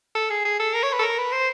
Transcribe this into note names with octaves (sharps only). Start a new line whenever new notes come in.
A4
G#4
G#4
A4
A#4
C#5
B4
A4
A#4
B4
C5